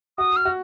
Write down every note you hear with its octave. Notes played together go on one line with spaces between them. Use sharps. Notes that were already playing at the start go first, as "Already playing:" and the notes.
F#4 D#6
F6
F#4